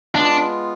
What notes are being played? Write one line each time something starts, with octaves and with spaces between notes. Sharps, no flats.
G#3 B3 D4 F4